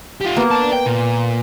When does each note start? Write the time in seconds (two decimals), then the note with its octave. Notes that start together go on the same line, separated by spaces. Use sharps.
0.21 F4 G4
0.36 A#3 B3
0.51 D5 A5
0.73 G5
0.86 A#2